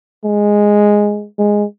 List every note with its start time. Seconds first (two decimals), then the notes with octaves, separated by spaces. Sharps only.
0.24 G#3
1.39 G#3